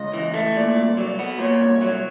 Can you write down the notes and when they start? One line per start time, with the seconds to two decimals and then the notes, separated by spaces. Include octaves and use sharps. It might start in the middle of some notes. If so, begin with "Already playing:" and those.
Already playing: C#2 D#5
0.14 E3
0.34 A3
0.56 A#2 D5
0.76 C2
0.97 F#3
1.19 B3
1.39 A#2 C#5
1.60 C2
1.81 F#3